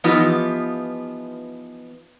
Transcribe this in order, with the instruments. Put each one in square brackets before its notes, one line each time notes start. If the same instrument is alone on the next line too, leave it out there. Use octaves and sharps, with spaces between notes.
[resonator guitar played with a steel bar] E3 F3 B3 D#4 F4 G4